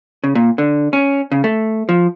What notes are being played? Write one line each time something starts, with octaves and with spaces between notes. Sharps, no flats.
C#3
A#2
D3
C#4
C#3
A3
F3